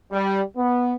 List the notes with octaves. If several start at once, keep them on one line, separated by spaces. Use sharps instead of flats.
G3
B3